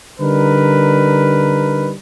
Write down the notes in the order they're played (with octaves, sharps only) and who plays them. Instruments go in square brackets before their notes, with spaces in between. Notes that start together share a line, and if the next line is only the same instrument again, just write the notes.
[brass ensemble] D3 G3 D#4 A#4 B4